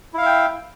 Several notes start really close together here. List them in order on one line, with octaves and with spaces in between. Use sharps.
E4 F5 E5 G5